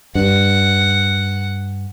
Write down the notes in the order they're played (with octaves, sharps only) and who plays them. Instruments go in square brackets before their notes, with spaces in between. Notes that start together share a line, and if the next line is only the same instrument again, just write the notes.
[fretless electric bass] G2 [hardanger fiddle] F#5